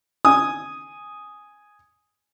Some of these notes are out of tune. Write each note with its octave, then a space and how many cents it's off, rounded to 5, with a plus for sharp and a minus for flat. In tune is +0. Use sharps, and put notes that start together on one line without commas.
G#5 +0 D#6 +0